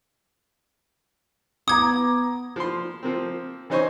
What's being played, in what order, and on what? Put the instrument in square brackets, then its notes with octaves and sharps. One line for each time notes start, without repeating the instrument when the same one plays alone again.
[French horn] B3 [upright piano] A#5 D6 [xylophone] D#6 G#6
[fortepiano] F3 C6
F3 A#3 C4
E3 C#4 D#4 C5 G#5 C#6